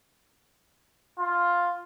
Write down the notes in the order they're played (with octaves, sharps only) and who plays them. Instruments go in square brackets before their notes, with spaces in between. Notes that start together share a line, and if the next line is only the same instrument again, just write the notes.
[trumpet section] F4